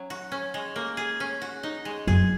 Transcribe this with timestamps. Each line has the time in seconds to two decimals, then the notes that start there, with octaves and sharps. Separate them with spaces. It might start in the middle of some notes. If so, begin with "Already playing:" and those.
Already playing: F#3 C#4
0.10 F#4
0.32 C#4
0.54 G#3
0.76 A#3
0.97 G#4
1.20 C#4
1.42 F#4
1.63 D#4
1.85 G#3
2.07 F#2 G#4